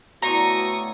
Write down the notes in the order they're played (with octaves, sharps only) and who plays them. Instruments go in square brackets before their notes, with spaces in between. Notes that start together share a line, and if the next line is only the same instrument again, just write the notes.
[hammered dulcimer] A2 D3 G#5 [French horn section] B3 F#4 [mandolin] A#5 [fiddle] C#6 D#6